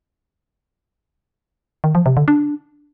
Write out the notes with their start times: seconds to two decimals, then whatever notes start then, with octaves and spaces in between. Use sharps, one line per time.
1.84 D#3
1.95 F3
2.06 C3
2.17 D3
2.28 D4